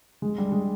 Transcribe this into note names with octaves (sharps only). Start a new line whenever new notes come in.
G#3
G3
G#3